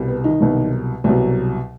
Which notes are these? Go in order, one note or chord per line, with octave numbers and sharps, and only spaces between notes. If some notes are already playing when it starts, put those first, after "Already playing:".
Already playing: C2 B2 G3
B3
D#3 D#4
C2 B2 F#3
C2 B2 F#3